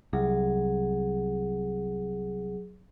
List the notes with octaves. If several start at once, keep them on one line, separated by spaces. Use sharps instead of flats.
C2 F#3 G#4